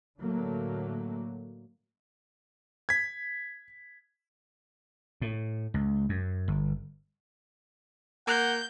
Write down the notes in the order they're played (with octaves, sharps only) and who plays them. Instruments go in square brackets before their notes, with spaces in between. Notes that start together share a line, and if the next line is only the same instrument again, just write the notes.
[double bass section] A2 D3 F#3 A3 A#3
[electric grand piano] G#6 B6
[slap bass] A2
C#2
F#2
G1
[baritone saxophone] A#3 [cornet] F#5 [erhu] G6